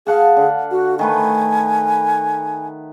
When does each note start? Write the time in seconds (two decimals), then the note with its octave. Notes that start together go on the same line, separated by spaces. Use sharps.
0.07 G#4 F5 F#5 A5
0.37 D3
0.71 F#4
0.99 D#3 A3 B4 G#5